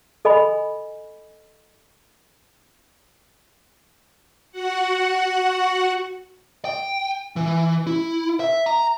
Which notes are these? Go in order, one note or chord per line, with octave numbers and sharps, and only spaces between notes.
A4 D#5 G#5 B5
F#4 F#5
G5
E3
E4
E5
A#5